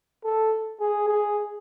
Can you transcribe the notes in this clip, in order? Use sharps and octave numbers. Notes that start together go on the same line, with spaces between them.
A4
G#4
G#4